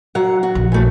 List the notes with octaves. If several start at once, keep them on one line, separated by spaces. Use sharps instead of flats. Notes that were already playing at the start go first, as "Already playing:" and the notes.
F#3 F#5
F#4
A#1
E3 A3